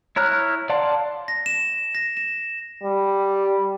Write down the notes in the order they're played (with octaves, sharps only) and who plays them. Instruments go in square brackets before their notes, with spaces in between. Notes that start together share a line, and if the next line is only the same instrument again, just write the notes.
[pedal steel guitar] E4 C#5 A#5 F6 F#6
D5 F5 F#5 A5 C6
[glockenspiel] A#6
E7
A#6
E7
[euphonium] G3